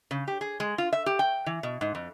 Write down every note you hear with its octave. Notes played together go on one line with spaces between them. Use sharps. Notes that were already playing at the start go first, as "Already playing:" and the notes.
C#3
G4
G#4
G#3
F4
E5
G4
G5
E3
B2
G#2
F2